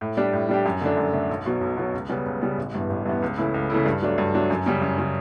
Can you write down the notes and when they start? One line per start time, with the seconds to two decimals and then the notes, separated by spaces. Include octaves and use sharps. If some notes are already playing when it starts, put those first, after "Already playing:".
0.01 A2
0.17 G3 D4 G4
0.33 A2
0.49 G3 D4 G4
0.65 F#2
0.81 D3 A3 D4
0.97 F#2
1.13 D3 A3 D4
1.29 B1
1.46 B2 F#3
1.61 B1
1.77 B2 F#3
1.93 C#2
2.09 C#3 G3 B3
2.26 C#2
2.41 C#3 G3 B3
2.57 A1
2.74 G2 E3 B3
2.89 A1
3.05 G2 E3 B3
3.22 C#2
3.37 C#3 E3 A3 E4
3.54 C#2
3.70 C#3 E3 A3 E4
3.86 G2
4.02 F#3 A3 D4
4.18 G2
4.34 F#3 A3 D4
4.50 F#2
4.66 C#3 G3
4.82 F#2
4.98 C#3 G3